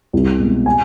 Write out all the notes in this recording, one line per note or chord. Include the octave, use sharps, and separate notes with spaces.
C2
B2 G#3
G#5